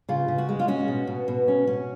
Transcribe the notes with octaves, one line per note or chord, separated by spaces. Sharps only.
C#3 F4
C#3
F#4
G#3
F4
C#4 F#4
B2
B2
B2
C#4
C#4